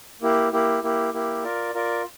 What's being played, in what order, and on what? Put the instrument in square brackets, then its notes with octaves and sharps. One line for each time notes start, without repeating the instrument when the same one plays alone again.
[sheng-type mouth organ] A#3 E4 G4
A#3 E4 G4
A#3 E4 G4
A#3 E4 G4
F4 A#4 D5
F4 A#4 D5